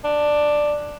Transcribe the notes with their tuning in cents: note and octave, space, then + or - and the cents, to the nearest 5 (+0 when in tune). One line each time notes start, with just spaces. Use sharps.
D4 +10